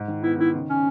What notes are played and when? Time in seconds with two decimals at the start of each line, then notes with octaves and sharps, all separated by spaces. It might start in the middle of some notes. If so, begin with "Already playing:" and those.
Already playing: G#2
0.08 D#3
0.23 B3 E4
0.38 D#3 E4
0.54 C#3
0.69 C#3 C#4